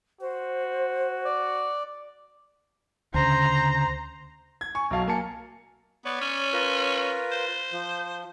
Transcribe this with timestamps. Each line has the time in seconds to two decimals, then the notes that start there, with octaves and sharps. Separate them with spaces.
0.21 F#4 C5
1.25 D5
3.14 D2 C#3 C5 A#5
4.61 G#6
4.75 G#5 C#6
4.91 B1 F#3 F5 A5
5.07 F#3 A#3 G#5 A5 C#7
6.05 B3 C#5 D5 B5
6.21 C#4
6.53 F4 A#4 B4
7.31 C5
7.72 F3